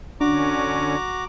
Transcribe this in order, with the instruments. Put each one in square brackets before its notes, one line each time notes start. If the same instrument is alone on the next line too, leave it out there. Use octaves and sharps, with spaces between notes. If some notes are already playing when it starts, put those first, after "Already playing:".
[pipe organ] D3 C#4 [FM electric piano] D4 [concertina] F#4 A#5 D6